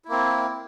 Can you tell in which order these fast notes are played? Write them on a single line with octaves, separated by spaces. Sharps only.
E4 A#3 C4